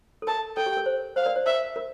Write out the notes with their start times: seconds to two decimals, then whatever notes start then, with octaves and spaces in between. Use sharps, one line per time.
0.22 A4
0.27 A#4 A5
0.57 A4 G5
0.66 G4
0.77 A#4
0.86 C5
1.16 C5 F5
1.26 A#4 D5
1.36 C5
1.46 C5 E5
1.76 A#4